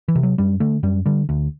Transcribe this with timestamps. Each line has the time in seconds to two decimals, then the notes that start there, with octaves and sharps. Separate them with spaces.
0.08 E3
0.15 C3
0.23 F#3
0.38 F#2 G3
0.60 D3 A3
0.83 F#2 G3
1.06 D3 G3
1.29 D2